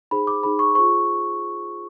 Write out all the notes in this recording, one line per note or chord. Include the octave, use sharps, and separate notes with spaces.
D#4 G#4 C5 B5
D6
D#4 G#4 C5 B5
C#6
F4 G#4 C5 C#6